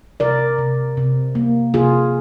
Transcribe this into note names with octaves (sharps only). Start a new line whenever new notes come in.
C3 A#4 D5
C3
C3
A#3
C3 F4 G#4